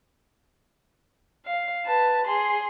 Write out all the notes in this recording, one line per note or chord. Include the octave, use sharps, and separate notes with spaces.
F5
B4 A5
G#4 C6